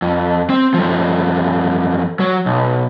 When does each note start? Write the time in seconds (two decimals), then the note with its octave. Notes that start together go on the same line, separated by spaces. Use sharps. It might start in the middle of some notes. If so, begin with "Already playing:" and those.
0.02 F2
0.50 C4
0.74 F#2 F3
2.20 F#3
2.46 B1